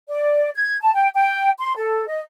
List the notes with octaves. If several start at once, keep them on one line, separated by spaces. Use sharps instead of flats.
D5
G#6
A5
G5
G5
C6
A4
D#5